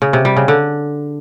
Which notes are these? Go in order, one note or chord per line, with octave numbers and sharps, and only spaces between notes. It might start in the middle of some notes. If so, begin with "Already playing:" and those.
C#3
C3
G3
C#3
D3